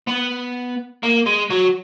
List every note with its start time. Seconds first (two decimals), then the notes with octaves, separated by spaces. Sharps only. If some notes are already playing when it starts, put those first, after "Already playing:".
0.07 B3
1.03 A#3
1.26 G#3
1.50 F#3